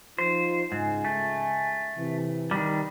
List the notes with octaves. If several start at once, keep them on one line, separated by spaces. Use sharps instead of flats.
F3 D#4 F4 C5
C#2 G#2 G#3 G#5
A3
C3 E3
D#3 G3